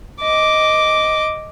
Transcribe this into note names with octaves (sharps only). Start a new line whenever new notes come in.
D#5 D6